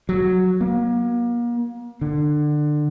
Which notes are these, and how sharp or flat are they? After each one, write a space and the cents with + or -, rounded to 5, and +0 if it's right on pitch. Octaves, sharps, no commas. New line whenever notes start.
F#3 -5
A#3 +35
D3 +25